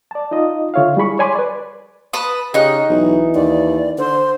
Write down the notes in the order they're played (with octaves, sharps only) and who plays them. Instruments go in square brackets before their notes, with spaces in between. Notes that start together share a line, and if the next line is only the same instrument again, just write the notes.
[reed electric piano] D5 A5
D#4 F4 D#5
D3 F4 C#5 E5 F5
G3 E4 G#4 B5 C#6
C#5 D5 G#5 B5 C6 D6
B4 D5
[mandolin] B4 A5 D#6
[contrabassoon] C#3 [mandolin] D#4 F#6 [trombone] G4
[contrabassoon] B1 [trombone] E3
[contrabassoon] D#2 [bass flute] D5
[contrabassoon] D3 [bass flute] C5